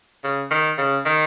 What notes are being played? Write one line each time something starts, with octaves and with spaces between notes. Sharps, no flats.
C#3
D#3
C#3
D#3